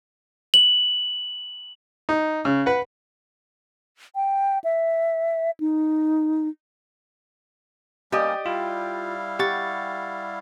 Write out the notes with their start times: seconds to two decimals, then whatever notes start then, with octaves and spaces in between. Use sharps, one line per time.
0.54 F#7
2.09 D#4
2.45 C#3
2.66 B4 F#5
4.15 G5
4.64 E5
5.60 D#4
8.12 G3 A#3 C#4 G4 D5 D#5 G5 D#6
8.46 G3 E4 F4 F5
9.39 G4 F#5 C#6 A6